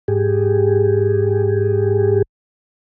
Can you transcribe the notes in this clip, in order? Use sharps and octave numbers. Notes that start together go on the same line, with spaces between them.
G#2 G4 G#4